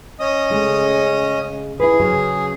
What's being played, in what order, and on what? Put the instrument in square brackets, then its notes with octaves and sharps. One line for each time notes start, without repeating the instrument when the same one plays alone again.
[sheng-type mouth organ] C#4 D#5 D#6
[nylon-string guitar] C#3 G#3 A3
[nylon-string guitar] E4 B4 [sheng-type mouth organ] G#4
[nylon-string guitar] C#3 F#3 C#4